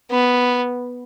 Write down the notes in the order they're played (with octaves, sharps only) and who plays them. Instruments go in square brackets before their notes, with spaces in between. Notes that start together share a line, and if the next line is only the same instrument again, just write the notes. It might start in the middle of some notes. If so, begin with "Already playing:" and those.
[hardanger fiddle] B3